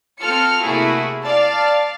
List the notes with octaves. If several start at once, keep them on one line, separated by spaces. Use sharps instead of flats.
C4 F4 A4 F6 C#7
C3 A3 A#3 E4 F#4 G#4
D5 F5 A5